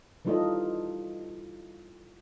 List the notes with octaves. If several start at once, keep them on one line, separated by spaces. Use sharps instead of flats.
E3 G3 D#4 F4 A4 D#5